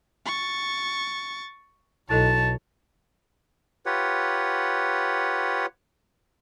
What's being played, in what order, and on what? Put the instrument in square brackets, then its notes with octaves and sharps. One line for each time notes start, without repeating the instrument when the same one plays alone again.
[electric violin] C#6 A6
[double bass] B1 [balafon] E4 A4 D#5 [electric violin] C#5 [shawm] A5
[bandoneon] F4 G4 B4 C#5 F#5